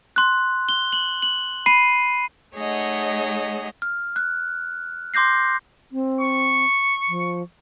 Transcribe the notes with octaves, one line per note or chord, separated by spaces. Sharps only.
C6 F#6
G7
F#7
F#7
B5 C7 D#7
A3 D#4 G#4 C#5 D#5 F#5
F6
F#6
C6 D6 G6 A#6 C7
C4
C#6
F3